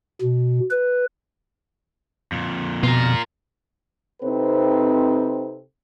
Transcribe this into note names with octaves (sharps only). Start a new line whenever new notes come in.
B2
B4
F2 A#2
B2 F4 A#4
C3 C4 D#4 A4 B4 C5